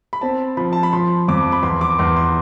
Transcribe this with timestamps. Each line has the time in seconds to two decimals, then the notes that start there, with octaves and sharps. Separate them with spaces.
0.13 B5
0.21 C4 A5
0.57 F3 B5
0.73 A5
0.83 B5
0.93 F3 C6
1.28 F2 D6
1.52 B5
1.63 E2 C6
1.81 D6
1.99 E2 C6
2.16 C6